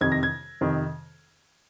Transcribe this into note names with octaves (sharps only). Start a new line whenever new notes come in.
F2 C3 D#3 G#6
A#6
G#6
F2 C3 D#3